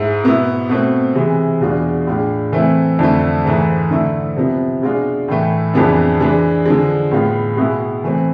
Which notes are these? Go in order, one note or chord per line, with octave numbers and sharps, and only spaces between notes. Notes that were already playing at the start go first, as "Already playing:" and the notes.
Already playing: G#2 G#3 E4
B2 B3 E4
B2 A3 C4
C3 E3 G#3
E2 B2 G#3 D4 F4
A2 G#3 D4 F4
E3 A3 C4 E4
F2 D3 A3
G#2 E3 A3
D3 A3 E4
C3 F3 B3
B2 G#3 D4 F4
A2 E3 A3
F2 E3 G#3 B3 D4
E3 G#3 D4
D3 F3 G#3
A2 G#3 B3 F4
B2 G#3 B3 E4
E3 A3 C4